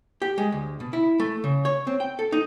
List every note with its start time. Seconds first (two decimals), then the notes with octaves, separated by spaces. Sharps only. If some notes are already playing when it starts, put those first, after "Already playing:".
0.22 G4
0.38 G#3
0.52 D2
0.80 B2
0.93 E4
1.20 A3
1.44 C#3
1.65 C#5
1.87 C4
2.00 G5
2.19 A4
2.32 D#4